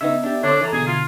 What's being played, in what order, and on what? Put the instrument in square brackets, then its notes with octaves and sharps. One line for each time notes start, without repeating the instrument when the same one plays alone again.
[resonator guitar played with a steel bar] C#3 D#4 [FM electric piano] B3 E5
[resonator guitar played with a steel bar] D4 G4
[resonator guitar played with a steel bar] D3 C4 [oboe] D4 [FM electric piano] A4 C#5
[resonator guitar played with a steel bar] E3 C5 A#5 [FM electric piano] A4
[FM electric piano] B2 D3 G#6 [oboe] G#4
[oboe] F4